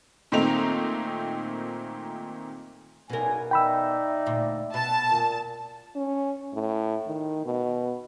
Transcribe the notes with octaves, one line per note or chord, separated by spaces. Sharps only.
A#2 D#3 A3 C4 D#4 F7
F#1 B1 B2 A#4 G#5
D#4 D5 E5 G5 B5 E6
D2 A#2
B2 A5
A#2
C#4
A2
D#3
B2